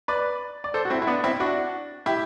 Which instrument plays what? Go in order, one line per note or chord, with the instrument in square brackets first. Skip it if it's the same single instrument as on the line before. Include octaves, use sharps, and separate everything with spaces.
[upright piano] B4 D5
D5
A4 C5
F#4
C4 E4
E4
B3 D4
C4 E4
D4 F#4
E4 G4